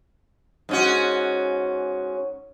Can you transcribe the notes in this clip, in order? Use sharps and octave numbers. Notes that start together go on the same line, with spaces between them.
G#2 C#4 F#4